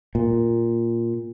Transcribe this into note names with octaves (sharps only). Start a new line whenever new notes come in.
A#2